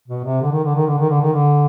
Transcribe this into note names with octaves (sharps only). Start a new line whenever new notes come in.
B2
C3
D3
D#3
D3
D#3
D3
D#3
D3
D#3
D3